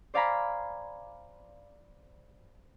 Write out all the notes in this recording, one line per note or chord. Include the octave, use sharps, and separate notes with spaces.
C5 D5 F5 G#5 A#5 B5